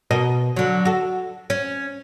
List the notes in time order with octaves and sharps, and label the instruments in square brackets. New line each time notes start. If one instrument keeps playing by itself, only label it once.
[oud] B2 A#4 D#5
D3 F#3
F#4 A4
C#4